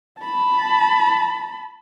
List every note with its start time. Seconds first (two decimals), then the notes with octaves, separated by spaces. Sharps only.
0.21 A5 B5